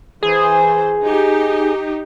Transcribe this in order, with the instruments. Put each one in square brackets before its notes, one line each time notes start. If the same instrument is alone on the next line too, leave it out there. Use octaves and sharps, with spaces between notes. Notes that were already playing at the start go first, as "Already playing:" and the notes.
[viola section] E3 C5 [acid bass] G#4
[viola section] D#4 G4